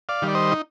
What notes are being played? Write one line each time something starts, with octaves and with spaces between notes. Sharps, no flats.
D5 F5
D#3 G3
D5
C5 D#5
D#4